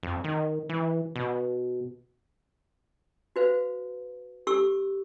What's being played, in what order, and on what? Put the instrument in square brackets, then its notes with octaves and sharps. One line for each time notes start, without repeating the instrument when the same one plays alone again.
[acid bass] F2
D#3
E3
B2
[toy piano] F#4 B4 C5 F5
G4 A4 C#6 E6